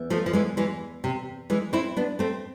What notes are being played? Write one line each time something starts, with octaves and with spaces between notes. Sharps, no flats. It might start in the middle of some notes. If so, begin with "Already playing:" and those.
Already playing: E2
F3 A3
F3
E3 G#3
E3 G#3
C3
E3 G#3
C4 E4
B3 D4
A3 C4